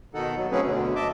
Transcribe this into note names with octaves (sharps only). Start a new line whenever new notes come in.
B2 D#3 D#4 A4 F#5
D#2 F#3 B3
F#3 A3 C4 C#4 G#4 B4
D2 B2 D3
D#5 E5 A5 D6